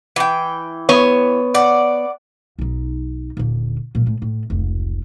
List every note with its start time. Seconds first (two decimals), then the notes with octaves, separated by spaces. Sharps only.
0.16 E3 G5
0.89 B3 C#5
1.54 D5 F#5
2.59 B1 D#4
3.37 D#1 D3
3.95 A#2 F3
4.07 A2
4.22 A2
4.50 F1 C#2